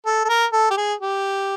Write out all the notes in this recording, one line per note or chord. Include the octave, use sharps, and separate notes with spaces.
A4
A4
A#4
A4
G4
G#4
G4